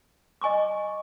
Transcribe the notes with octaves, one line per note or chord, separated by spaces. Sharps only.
D#5 G#5 C#6 D6